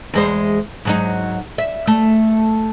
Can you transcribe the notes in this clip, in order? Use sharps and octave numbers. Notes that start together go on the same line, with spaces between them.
E2 G#3 C5
G#2 F#3 D#4
E5
A3